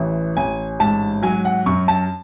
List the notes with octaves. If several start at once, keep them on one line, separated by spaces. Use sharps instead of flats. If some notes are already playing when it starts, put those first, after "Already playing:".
Already playing: A1 E3
A1 G#5
G#2 A5
F#3 G#5
F#5
F#2 C#6
A5